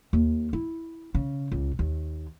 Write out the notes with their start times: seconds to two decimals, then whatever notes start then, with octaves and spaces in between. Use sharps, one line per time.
0.13 D#2
0.53 E4
1.15 C#3
1.52 C#2
1.79 D#2